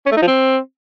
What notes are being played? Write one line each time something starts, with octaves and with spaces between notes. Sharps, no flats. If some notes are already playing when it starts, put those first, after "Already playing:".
C#4
A3
D#4
F3
C4